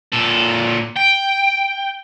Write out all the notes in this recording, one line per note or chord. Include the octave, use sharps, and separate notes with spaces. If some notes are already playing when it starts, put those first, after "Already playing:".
A#2 A4
G5